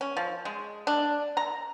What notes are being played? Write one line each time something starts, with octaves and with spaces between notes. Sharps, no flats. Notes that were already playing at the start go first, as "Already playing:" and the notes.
C#4
F3
G#3
D4
A#5